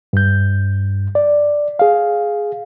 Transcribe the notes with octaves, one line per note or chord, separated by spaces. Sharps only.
G2 G6
D5
G#4 F5